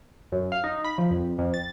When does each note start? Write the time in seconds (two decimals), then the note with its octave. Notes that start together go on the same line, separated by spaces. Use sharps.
0.32 F#2
0.52 F5
0.64 D#4
0.84 B5
0.98 F3
1.11 F2
1.38 F2
1.54 A6